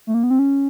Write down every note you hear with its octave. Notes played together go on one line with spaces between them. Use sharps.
A3
A#3
B3
C4
C#4